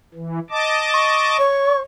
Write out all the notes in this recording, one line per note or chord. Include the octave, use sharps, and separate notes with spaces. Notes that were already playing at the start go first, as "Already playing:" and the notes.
E3
D#5 A5 D6
C#6
C#5